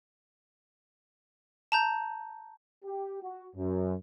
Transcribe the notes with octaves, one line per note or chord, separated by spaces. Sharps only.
A5 A#5 G6
G4
F#4
F#2